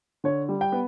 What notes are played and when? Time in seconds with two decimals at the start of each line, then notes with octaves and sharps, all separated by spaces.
0.24 D3 C#5
0.49 G3
0.61 G5
0.72 B3